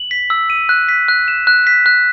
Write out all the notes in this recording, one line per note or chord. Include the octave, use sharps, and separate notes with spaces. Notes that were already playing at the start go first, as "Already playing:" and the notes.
Already playing: F#7
B6
E6
D#7
F#6
B6
F#6
E7
F#6
B6
F#6